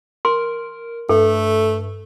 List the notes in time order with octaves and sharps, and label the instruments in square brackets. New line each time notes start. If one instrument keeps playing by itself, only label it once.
[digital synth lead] A#4 [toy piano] C6
[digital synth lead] G2 [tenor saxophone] A3 [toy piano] A4